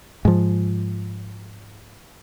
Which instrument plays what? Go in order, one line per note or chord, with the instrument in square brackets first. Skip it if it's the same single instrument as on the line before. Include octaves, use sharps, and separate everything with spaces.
[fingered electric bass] G#2 F3